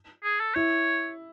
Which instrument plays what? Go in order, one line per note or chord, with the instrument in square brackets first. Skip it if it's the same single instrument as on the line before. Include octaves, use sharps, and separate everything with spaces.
[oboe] G#4
A4
[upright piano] E4 [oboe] C#5